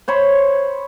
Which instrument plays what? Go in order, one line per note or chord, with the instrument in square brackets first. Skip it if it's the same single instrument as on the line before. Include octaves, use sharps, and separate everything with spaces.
[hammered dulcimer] C5 C#5 B5